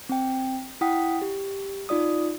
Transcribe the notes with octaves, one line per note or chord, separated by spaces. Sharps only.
C4 G5
E4 F#5 G5 D#6 B6
G4
D#4 F4 D5 D#6